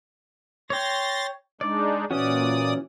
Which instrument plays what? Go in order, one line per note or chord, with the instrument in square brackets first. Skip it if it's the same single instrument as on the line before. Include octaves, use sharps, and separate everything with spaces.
[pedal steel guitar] C#5 G5 [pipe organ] C6 A6 A#6
[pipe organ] G#3 D4 D#4 [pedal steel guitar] D5
[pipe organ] A#2 D5 D#6 [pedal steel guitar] E3 C#4 F#4